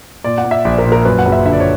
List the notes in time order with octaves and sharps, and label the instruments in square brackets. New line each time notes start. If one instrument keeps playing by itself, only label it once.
[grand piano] A#2 D5
F#5
A#2
E5
A#1 D5
A#4
A#2
A#4
F#2 B4
F#5
F#1
E5
D3 E5
D5
C#5